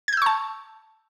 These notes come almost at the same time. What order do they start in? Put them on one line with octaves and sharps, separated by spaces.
G#6 G6 E6 C#6 A5